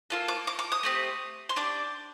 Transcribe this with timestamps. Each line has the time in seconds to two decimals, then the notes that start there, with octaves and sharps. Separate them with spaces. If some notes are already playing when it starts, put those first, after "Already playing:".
0.10 A#3 F4 A4
0.28 D6
0.47 D6
0.59 D6
0.72 D#6
0.83 A3 C4 G4
1.49 C6
1.56 D4 G4 D6